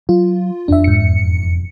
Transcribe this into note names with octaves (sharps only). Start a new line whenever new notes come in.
F#3 F4
E1 F2 D4 E5
G#2 C#7